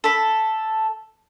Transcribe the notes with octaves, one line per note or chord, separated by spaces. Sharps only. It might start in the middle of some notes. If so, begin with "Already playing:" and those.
A4 B5